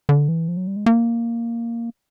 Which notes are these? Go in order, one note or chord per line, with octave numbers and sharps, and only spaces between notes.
D3
E3
F3
F#3
G3
G#3
A#3